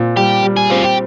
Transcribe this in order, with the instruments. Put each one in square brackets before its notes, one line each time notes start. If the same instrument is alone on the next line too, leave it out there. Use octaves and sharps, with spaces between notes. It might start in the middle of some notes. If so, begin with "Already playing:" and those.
Already playing: [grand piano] A#2 C4
[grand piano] G3 [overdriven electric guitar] G4
[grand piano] G3
[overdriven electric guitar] G#4
[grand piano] C4 [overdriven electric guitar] F4
[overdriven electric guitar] G4